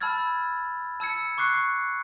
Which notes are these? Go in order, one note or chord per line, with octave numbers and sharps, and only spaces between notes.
A5 B5 E6 F6 G#6 A6
A5 E6 G#6 C#7
C#6 D6 F#6 C7